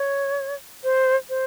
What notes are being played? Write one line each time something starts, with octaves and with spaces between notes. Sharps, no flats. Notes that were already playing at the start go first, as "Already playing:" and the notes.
Already playing: C#5
C5
C5